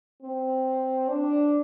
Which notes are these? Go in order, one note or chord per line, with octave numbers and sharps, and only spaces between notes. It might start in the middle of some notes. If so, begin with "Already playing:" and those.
C4
D4